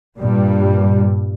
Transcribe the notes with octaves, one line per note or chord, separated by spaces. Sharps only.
G2 A#2 G3